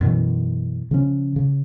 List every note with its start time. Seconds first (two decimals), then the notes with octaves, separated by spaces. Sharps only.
0.01 F#2 B2 E3
0.91 C#3 F3 C#4
1.36 C#3